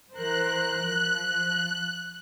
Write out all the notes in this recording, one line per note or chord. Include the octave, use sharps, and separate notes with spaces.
E3 A#4 C5 F#6
F3